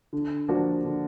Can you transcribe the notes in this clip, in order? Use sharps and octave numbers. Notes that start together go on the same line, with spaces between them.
D3
F3 A#3 D4 F#4
D3